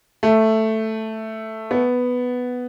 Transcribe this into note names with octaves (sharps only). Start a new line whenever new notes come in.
A3
B3